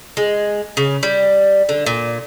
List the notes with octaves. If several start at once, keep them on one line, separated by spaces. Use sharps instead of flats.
G#3
C#3
G3
D3
A#2